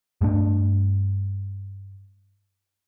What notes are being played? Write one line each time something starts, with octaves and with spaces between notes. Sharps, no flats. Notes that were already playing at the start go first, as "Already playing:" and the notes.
G2 A3 D4